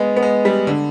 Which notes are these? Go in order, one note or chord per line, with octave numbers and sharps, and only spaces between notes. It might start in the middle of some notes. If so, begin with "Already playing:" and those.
Already playing: G#3 B3
B3
G#3
G3
D3